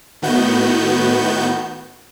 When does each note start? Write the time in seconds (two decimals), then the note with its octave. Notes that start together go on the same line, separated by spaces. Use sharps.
0.22 A2 D#3 B3 F#4 G6